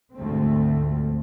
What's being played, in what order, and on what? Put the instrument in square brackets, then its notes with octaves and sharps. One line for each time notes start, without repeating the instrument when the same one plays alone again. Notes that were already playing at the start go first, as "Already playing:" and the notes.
[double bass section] D2 G#2 D3 F3 A3 C4